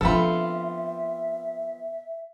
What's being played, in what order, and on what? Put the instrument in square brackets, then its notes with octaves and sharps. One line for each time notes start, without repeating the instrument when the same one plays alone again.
[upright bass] F3 D4 [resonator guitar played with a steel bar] B3 C4 F4 [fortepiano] A4 B5 [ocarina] E5